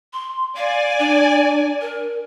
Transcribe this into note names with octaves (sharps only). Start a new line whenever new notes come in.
C6
D5 F5 G#5
D4
A#4